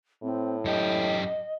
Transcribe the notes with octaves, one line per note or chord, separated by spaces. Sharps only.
A2 C4
F#2 G4 D#5